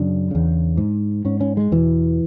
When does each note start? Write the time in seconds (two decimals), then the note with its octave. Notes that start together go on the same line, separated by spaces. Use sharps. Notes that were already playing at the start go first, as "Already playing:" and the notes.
Already playing: F#2 C#3 D4
0.31 E2 C#3
0.77 G#2
1.25 G#2 C#4
1.40 C#4
1.57 G#3
1.72 E2 B2 E3